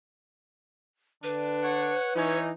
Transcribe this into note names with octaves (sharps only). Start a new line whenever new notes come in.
D3 D4 B4
C#5 F#5
E3 C#4 D#4 E4 C#5